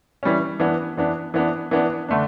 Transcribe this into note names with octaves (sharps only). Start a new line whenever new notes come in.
E3 G3 C#4
E3 B3 D4
E3 B3 D4
E3 B3 D4
E3 B3 D4
D3 A3 D4